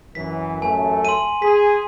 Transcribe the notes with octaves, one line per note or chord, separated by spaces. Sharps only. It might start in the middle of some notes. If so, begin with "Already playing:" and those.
F#2 E3 B6
A1 F#2 A3 G#5
C6 D#7
G#4 B6